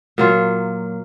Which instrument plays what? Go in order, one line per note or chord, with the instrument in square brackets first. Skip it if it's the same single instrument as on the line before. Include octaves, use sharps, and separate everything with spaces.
[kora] A#2 F#3 A#3 F4